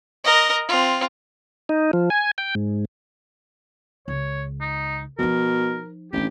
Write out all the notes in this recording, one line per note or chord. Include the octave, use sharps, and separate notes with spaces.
A#4 D#5
C4 F4
D#4
F3
G#5
G5
G#2
C#2 C#5
D#4
B2 F3 D#4 A#4
A1 C4 D4 G4